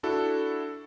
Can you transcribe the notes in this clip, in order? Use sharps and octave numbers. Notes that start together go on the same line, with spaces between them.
D4 E4 F#4 A4